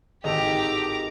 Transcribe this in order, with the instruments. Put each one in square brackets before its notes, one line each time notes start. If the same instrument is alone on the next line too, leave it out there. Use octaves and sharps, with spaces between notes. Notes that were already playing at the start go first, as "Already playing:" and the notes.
[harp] G#1 [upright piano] A2 A4 D#5 [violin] G4 [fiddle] A#5 D6